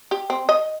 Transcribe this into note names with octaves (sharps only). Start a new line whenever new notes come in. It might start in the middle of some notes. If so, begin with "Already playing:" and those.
G4
C4
D#5